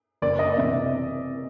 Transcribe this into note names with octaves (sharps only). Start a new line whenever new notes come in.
F#1 D5
D#5
C3 E3 E5